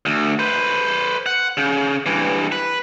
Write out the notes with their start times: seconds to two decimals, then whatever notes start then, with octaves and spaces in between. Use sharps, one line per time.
0.06 D2
0.39 B4 C5
1.26 F#5
1.57 C#3
2.06 G2 E3
2.52 B4